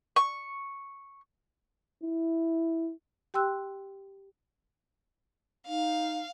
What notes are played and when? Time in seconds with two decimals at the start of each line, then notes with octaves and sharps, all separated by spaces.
0.16 C#6
2.03 E4
3.34 G4 G5 C6 E6 F#6
5.67 D#4 F5